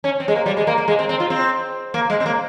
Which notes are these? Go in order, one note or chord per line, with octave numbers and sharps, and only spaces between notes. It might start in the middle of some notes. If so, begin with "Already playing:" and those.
C#4
C4
G#3
A#3
G3
G#3
A#3
A#3
G#3
C4
C4
F4
C4
A#3
G#3
C4
A#3